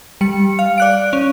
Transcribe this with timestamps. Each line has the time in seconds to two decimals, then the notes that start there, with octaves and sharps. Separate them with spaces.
0.21 G3 C#7
0.59 F5
0.78 D5 F#6 D7
1.13 C#4